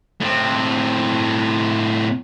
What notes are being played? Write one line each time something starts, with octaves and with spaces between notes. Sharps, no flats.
A2 C4